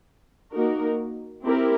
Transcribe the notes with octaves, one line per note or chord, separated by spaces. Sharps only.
A#3 D#4 F#4 A#4
C4 E4 G4 A#4